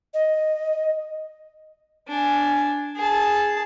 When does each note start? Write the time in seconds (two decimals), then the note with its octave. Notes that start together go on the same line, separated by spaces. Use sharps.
0.14 D#5
2.08 D4 G#5
2.96 G#4 A5